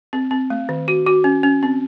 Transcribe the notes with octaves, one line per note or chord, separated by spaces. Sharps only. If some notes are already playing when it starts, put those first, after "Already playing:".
C4
C4
A3
D#3
F#4
F#4
C#4
C#4
C4